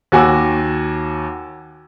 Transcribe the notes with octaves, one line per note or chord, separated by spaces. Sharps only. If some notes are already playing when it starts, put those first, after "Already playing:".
D#2 F#4 G#5 D6 E6